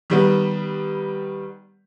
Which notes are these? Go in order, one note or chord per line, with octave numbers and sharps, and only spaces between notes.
D#3 G3 B3